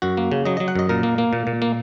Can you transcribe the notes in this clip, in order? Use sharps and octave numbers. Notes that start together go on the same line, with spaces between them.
F#2 F#4
A#3
C#3
F#3 D#5
F#3 D#5
F#5
F#2 D#5
A#2 A#4
A#3
A#3
A#2
A#2
A#3